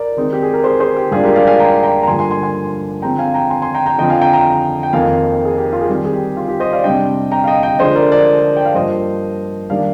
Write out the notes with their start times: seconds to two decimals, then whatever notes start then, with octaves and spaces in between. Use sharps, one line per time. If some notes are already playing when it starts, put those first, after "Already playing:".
Already playing: A#4 D5
0.17 D#3 G#3 C4 D#4
0.33 G4
0.43 G#4
0.53 A#4
0.64 G#4 C5
0.80 G#4 C5
0.97 G4
1.12 G#2 G3 A#3 D4 F4 G#4
1.24 G4 A#4
1.36 D5 F5
1.47 F5 G#5
1.59 G5 A#5
1.83 G5 A#5
2.03 A#5
2.07 G2 D3 F3 A#3 G#5 C6
2.19 G#5 C6
2.31 G#5 C6
2.43 G#5 C6
3.02 D3 F3 G#3 C4 G5 A#5
3.19 F5 G#5
3.34 G5 A#5
3.50 G#5 C6
3.62 G#5 C6
3.74 G5 A#5
3.86 G5 A#5
3.98 D3 F3 C4 D#5 G5
4.10 F5 G#5
4.22 G5 A#5
4.33 G5 A#5
4.83 G5
4.93 F2 D#3 A#3 D#4 F5 G#5
5.45 G#4
5.57 G4
5.73 F4
5.81 G#4
5.88 D#3 G3 C4 G4
6.05 G#4
6.13 G4
6.37 F4
6.48 G4
6.60 C5 D#5
6.73 D5 F5
6.84 C3 G3 D4 D#5 G5
7.32 G5 A#5
7.44 F5
7.47 D#5 G5
7.63 D#5 G5
7.79 D3 F3 G#3 D4 C5 D#5
7.95 A#4 D5
8.11 A#4 D5
8.57 G5
8.65 F5
8.75 G2 F3 A#3 C5 D#5
9.70 D#3 G3 A#3 D4 D5 F5